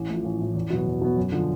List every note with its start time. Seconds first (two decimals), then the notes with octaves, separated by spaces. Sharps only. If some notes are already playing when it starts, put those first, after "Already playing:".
Already playing: A1
0.09 A2 F3
0.24 A1
0.40 A2 F3
0.54 E2
0.70 B2 F#3 B3
0.86 E2
1.01 B2 F#3 B3
1.17 F#2
1.32 D3 F3